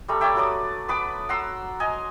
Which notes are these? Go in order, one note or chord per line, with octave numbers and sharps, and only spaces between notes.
G3 A3 A#5 B5
C#5 D5 E5 G5
F#3 B4 D5 D#6
B3 B4 B5 D6
F#5 A#5 C6 E6
D#5 G#5 A#5